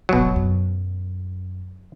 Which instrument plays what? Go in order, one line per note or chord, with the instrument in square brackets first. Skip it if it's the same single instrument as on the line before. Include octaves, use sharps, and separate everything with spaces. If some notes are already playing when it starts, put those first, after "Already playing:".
[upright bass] D1 G#1 [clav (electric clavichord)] B2 F#3
[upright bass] F#2